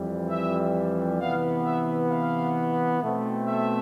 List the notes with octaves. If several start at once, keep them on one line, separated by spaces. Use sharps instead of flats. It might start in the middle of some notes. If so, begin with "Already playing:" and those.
Already playing: F2 E3 G3
E5
C3 E3 B3 F5
E5
F5
B2 A3 C4
E5